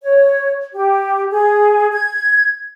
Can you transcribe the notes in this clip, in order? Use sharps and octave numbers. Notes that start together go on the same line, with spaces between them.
C#5
G4
G#4
G#6